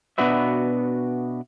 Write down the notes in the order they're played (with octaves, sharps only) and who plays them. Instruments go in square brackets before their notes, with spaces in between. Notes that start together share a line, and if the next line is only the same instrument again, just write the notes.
[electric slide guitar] B2 B3 D4 F#4 B4 E5